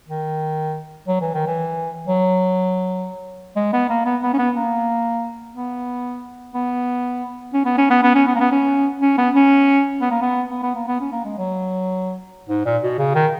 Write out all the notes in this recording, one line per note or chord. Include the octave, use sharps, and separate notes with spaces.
D#3
F#3
E3
D#3
E3
F#3
G#3
B3
A#3
B3
B3
C#4
B3
A#3
B3
B3
C#4
B3
C#4
B3
B3
C#4
B3
A#3
B3
C#4
C#4
B3
C#4
B3
A#3
B3
B3
B3
A#3
B3
C#4
A#3
G#3
F#3
G#2
A#2
B2
C#3
D#3